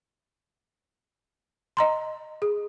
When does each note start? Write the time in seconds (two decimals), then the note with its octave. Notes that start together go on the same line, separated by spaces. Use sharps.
1.77 D#5 A#5 C6
2.42 G#4